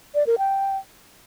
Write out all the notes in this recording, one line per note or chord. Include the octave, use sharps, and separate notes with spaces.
D5
A#4
G5